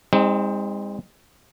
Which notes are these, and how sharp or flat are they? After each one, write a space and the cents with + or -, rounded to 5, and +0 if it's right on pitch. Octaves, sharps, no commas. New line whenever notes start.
G#3 -40 C4 +0 D#4 +20